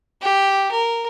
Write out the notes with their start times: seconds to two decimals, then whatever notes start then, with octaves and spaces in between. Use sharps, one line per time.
0.22 G4
0.71 A#4